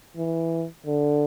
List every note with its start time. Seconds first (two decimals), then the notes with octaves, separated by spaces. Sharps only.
0.17 E3
0.86 D3